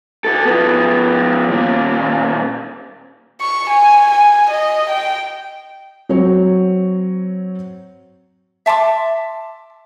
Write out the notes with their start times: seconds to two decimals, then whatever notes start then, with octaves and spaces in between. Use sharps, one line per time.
0.25 F#4 A4
0.45 F3 B3
1.48 D#2 A#2
3.41 C#6
3.69 G#5
4.11 G#5
4.49 D#5
4.90 G5
6.09 F#3 C4 C#5
8.66 E5 A5 C6 D6